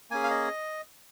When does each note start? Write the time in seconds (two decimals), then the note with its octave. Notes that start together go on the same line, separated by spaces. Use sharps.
0.10 A#3 C#4 G#4 G#5
0.24 F5
0.30 D#5